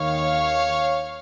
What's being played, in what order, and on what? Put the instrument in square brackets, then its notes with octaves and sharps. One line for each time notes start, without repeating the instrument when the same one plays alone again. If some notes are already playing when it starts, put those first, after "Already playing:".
Already playing: [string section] D#2 D#3 C#5 F5